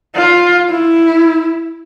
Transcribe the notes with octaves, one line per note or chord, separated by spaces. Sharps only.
F4
E4